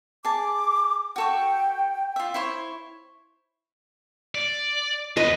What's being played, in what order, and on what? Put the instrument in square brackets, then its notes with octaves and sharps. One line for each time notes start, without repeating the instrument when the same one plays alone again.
[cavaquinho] G#4 A5 [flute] D6
[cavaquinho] F#4 A4 C#6 [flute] G5
[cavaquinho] F4 E5
E4 C5 C#5
[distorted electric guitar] D5
[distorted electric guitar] D#2 B4 [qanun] D#5